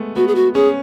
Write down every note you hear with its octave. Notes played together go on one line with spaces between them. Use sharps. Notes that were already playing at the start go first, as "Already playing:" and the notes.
Already playing: G#3 A3 B3
B3 F#4
G#4
F#4
C#4 G#4